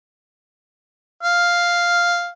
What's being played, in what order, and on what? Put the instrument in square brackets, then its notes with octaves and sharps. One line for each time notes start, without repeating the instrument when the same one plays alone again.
[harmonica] F5